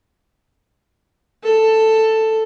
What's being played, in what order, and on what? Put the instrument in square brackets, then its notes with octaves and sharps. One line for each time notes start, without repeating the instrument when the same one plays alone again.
[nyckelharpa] A4